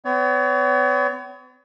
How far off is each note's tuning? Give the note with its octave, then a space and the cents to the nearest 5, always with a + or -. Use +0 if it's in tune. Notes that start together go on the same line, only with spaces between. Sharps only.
B3 +45 C#5 +35